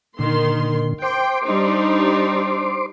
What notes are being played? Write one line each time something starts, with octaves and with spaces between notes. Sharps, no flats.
A#2 D3 D#3 C6
C5 G5 C6 D6
G3 D4 D#4